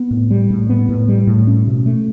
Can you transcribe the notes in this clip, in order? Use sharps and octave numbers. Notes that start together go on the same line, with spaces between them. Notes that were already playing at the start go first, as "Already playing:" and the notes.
Already playing: B3
A2
G3
A2
B3
A2
G3
A2
C#4
B2
A3